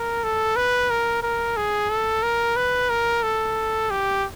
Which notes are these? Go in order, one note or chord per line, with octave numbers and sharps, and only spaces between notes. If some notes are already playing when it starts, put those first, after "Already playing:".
Already playing: A#4
A4
B4
A#4
A#4
G#4
A4
A#4
B4
A#4
A4
G4